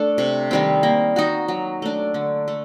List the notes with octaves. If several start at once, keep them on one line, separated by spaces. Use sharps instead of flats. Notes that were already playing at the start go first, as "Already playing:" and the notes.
Already playing: A3 D4 A4
C3
D#3 G3 C4
A#3
D#4 F#4
F#3
A3 D4
D3
A3